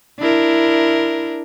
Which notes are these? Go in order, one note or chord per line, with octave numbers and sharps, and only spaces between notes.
D4 E4 A#4